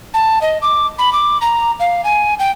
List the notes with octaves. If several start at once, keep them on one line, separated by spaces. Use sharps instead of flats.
A5
D#5
D6
B5
D6
A#5
F5
G#5
G5